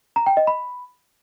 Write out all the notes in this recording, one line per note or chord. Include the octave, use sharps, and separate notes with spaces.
A#5
G5
D#5
B5